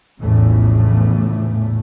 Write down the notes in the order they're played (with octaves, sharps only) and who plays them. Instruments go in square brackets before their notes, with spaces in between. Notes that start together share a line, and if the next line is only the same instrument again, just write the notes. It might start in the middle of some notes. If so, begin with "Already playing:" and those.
[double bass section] A#1 E2 A2 C#3 E3 A3